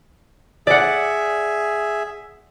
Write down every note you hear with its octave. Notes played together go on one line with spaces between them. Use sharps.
G#4 D5 E5 F#5